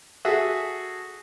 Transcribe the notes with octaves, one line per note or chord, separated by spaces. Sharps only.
F#4 G#4 A4 E5